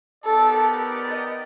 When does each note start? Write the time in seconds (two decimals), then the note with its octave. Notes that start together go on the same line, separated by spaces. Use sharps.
0.24 B3 D#4 G4 A4 A#4 D5
1.10 D#5